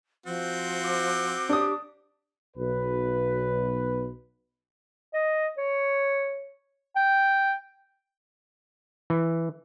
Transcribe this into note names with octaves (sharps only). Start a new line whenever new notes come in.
F3 C4 F#4
D6
D4 G4 D#6
B1 B4
D#5
C#5
G5
E3